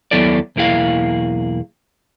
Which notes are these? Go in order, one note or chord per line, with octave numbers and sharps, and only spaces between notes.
D#2 F#3 B3 E4 A4 D5
B1 E2 A#3 E4 G#4 F5